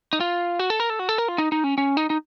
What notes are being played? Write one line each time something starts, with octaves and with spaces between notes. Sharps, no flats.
D#4
F4
F#4
A4
A#4
A4
F#4
A4
A#4
F4
D#4
D#4
C#4
C#4
D#4
D#4